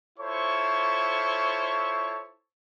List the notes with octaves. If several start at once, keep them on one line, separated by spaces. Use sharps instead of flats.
E4 F4 A4 C5 C#5 C#6